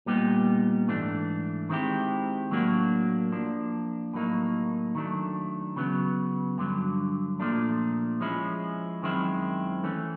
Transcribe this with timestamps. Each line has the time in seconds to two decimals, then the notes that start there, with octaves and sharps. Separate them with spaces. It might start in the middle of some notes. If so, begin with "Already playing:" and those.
0.06 A#2 G3 B3 D#4 G4
0.88 G#2 E3 A3 D4
1.69 D#3 G#3 C4 E4 G4
2.51 A2 F#3 A#3 D4 F#4
3.32 F3 A#3 D4
4.14 A2 F#3 A#3 D#4
4.95 D#3 F#3 A3 D4
5.76 C#3 F#3 B3
6.58 G2 D3 F#3
7.40 A#2 F3 A3 D4
8.21 F3 G#3 C#4 E4
9.02 F#2 D#3 G#3 C4 E4
9.84 E3 A3 C#4